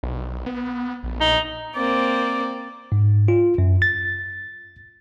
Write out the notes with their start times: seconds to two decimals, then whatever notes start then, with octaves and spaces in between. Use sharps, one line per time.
0.03 B1
0.46 B3
1.03 A#1
1.21 D#4
1.75 A#3 C4 D5
2.92 G#2
3.28 F4
3.58 F#2
3.82 A6